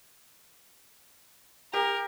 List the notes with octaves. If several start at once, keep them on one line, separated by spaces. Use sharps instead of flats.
G4 A#4